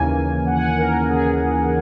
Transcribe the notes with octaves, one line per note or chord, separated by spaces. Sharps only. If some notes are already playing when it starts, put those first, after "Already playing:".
Already playing: D#2 C#3 E3 A#3 G#5
F#5
G#5
F#5
A#4
G#4